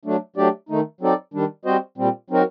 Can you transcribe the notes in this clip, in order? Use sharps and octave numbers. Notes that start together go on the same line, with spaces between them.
F#3 A3 D4
F#3 A3 D4 G4 D5
D#3 A3 D#4
F#3 C4 D#4 A4 D5
D#3 G3 D4
G3 C4 F#4 C5 D#5
A#2 G3 C4
F#3 C4 D#4 F#4 A#4